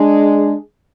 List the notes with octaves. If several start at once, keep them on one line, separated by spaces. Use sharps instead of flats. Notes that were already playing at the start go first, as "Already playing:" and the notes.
Already playing: G#3 D4 G#4